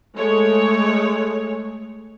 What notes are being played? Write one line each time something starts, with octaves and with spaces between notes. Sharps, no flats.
G#3 A3 C#5